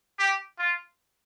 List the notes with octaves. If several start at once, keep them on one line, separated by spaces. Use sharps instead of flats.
G4
F4